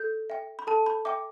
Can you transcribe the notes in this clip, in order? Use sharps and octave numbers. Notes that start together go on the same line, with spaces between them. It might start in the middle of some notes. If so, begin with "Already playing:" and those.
Already playing: A4 G6
E5 G5
B5
A4 A5
B5
E5 G5 D6